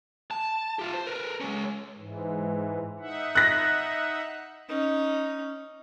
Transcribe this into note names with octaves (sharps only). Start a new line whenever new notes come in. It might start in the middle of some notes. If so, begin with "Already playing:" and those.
A5
F4 G4
C5
A#4 B4
G#3 C#4
G#2 E3
D#4 E5 F#5
F#6 A#6
C#4 D#4